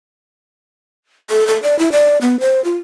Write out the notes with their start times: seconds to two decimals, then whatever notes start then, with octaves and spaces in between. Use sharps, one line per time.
1.30 A4
1.47 A4
1.63 D5
1.79 E4
1.92 D5
2.21 B3
2.40 C5
2.64 F4